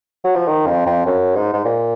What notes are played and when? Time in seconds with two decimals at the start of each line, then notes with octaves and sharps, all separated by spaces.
0.24 F#3
0.35 F3
0.47 D#3
0.66 F2
0.86 F2
1.06 F#2
1.35 G#2
1.53 G#2
1.64 A#2